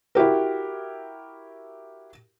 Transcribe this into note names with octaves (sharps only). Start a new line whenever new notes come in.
E4 F#4 G4 A#4